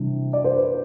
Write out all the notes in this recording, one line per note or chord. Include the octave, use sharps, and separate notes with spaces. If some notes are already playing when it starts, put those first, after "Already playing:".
Already playing: C3 E3 G3 D4
D5
C5
B4